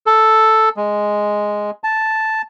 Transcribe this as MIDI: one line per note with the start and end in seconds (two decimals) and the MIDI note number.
0.06 0.69 69
0.77 1.71 56
1.84 2.42 81